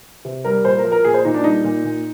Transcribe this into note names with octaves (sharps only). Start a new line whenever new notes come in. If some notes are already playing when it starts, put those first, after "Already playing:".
C3
G3 A#4
A#2 C5
A#4
F3
A#4
A#2 G#4
C5
A#2 D#4
D4
G3 D#4
A#2
A#2